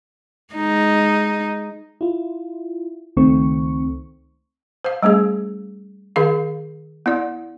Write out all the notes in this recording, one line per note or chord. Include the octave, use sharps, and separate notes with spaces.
G#3 D#4
E4 F4
C#2 D#3 A3 C4 C#6
C5 F5
G3 A3 C#4 G#4
D#3 G#4 F5
B3 E4 D5